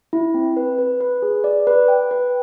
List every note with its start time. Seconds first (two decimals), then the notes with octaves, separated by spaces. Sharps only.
0.13 E4
0.34 C4
0.57 B4
0.79 B4
1.01 B4
1.22 G#4
1.44 D5
1.67 B4
1.88 G5
2.11 B4